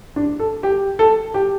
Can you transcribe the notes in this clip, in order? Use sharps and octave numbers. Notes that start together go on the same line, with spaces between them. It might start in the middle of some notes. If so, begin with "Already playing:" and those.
D4
A4
G4
A4
G4